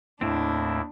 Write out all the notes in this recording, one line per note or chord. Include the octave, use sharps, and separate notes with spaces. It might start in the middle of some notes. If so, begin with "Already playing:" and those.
D#2 A2 C4 D4 E4